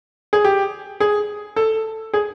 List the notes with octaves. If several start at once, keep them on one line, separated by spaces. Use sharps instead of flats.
G#4
G4
G#4
A4
G#4